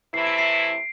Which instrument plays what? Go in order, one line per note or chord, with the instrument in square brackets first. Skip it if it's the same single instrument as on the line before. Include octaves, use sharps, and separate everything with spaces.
[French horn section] C3 E3 A3 E4 [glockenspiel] C7
[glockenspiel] D7
C7